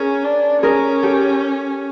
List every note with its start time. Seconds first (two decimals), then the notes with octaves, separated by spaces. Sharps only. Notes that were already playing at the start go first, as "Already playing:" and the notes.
Already playing: C#4 G#4 A#4
0.24 D4
0.63 C#4 G#4 A#4
1.03 G4 A4